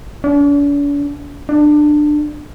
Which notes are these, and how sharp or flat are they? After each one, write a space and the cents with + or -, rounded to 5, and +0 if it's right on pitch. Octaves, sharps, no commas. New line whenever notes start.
D4 -45
D4 +20